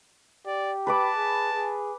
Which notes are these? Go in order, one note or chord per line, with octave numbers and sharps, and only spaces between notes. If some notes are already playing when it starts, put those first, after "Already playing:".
G4 D5
B4 A5 B5 D6
G#4
G#4